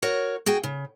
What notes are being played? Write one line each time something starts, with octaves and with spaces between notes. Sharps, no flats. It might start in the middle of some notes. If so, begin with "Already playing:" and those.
F#4 A#4 C#5
F#4 G#4 G5
C#3